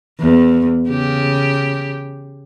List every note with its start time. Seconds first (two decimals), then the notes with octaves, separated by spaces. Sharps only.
0.20 E2
0.88 C#3 G4